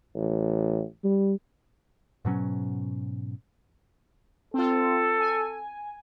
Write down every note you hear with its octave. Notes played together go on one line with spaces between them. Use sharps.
A1
G3
G#2 B2 F#3 C#4
C4 F4 A4
G#5